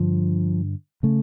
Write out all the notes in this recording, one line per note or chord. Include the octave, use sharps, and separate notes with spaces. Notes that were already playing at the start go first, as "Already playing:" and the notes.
Already playing: G2 D3 F3
C#3 A3